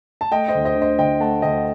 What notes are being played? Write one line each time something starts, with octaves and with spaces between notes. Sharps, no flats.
A5
A3 D#5 G5
C5 D#5
D2
C5 D#5
D3
C5 D#5
D2 D#5 G5
A3 F#5 A5
D2 D#5 G5